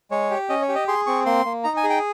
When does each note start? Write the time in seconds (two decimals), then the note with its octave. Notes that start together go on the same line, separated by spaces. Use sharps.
0.11 G#3 C#5
0.31 G4
0.49 C#4 D#5
0.62 C#5
0.69 G4
0.75 D#5
0.88 G#4 C6
1.07 C4 C#6
1.26 A#3 C6
1.45 A#3
1.64 D#4 A#5
1.77 G#5
1.84 G#4
1.90 G5